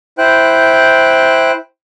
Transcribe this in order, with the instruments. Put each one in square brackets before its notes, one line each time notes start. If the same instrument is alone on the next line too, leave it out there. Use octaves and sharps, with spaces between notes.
[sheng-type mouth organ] E4 C5 G5 F#6